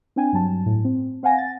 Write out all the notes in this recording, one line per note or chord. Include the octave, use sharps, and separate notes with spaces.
C4 D4 G5 G#5
G2 F#3 A5
A2
C4
C4 F5 F#5 G#5 A#6
A6